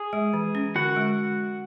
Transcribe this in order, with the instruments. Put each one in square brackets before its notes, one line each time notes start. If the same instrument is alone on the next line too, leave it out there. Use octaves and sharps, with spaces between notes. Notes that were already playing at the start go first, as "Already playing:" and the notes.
Already playing: [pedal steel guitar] G#4
[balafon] G#3
E3
C#4
[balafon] D3 [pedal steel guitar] F#4 F#5
[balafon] G#3